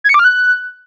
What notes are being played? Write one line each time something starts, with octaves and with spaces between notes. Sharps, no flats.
G#6
C#7
D6
F6
F#6